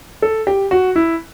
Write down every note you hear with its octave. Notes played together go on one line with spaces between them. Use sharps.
A4
G4
F#4
E4